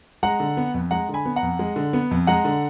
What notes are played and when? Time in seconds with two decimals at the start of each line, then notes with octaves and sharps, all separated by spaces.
0.23 G#3 F#5 A#5
0.40 D3
0.57 B3
0.74 F2
0.91 G#3 F#5 A#5
1.09 D3
1.14 G#5 B5
1.26 B3
1.36 F#5 A#5
1.42 F2
1.59 G#3
1.76 D3
1.93 B3
2.11 F2
2.27 G#3 F#5 A#5
2.45 D3